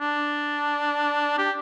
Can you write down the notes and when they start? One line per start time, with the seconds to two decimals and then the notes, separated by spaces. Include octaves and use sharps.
0.01 D4
1.38 G4